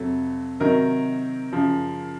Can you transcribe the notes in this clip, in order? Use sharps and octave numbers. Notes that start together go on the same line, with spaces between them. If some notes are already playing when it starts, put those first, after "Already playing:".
Already playing: F2 C3 F#3 A4
C3 D#3 F#3 A#4
F#2 C#3 F3